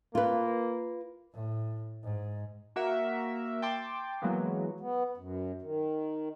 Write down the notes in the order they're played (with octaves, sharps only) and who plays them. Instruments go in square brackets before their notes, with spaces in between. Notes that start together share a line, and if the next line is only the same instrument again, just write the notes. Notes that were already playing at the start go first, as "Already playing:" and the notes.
[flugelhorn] A#3 [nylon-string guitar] F4 B4
[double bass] A2
G#2
[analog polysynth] A#3 F#4 A#4 E5
G5 A5 C6 D6
E3 F#3 G#3 A#3 B3
[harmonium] B3
F#2
D#3